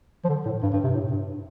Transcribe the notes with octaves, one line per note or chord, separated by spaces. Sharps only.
F3
D3
A2
G2
G2
C3
A2
G2